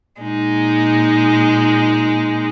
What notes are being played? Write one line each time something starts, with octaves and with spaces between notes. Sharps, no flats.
A#2 G#3 D#4